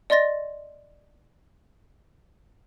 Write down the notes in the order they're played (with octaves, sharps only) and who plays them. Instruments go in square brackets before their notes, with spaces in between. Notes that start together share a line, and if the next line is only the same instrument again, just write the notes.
[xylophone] D5 D#5 C6 A6 A#6